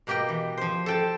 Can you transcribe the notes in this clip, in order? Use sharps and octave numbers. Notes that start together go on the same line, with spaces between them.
B2 A#3 G4 D#5 G5
E3
F3 C5
A4 G5 A5